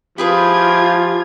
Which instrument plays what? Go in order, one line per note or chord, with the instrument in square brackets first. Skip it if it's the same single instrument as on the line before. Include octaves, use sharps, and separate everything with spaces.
[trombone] F3 [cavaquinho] E4 G#4 B4 [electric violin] F4 G#6 [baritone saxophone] G4